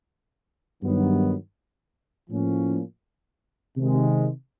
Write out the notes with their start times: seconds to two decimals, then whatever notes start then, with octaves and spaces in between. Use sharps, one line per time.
0.82 G2 D#3 F#3 B3
2.30 A2 F3 A#3 C#4
3.77 C3 D#3 G#3